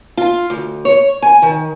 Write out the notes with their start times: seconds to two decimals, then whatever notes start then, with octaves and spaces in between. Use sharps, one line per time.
0.17 F4
0.50 D2
0.85 C#5
1.22 G#5
1.42 D#3